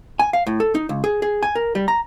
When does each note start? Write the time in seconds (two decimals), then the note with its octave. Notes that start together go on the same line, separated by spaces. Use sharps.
0.19 G#5
0.33 F5
0.47 A2
0.60 A4
0.75 D#4
0.89 C#2
1.04 G#4
1.22 G#4
1.43 G#5
1.55 A#4
1.75 G3
1.88 A#5